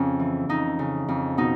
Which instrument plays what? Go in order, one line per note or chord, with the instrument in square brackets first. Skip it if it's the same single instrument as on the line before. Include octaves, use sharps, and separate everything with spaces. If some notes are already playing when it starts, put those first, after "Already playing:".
Already playing: [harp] F2 C#3 C#4
E3
F2 D#4
C#3
F2
B2 D#4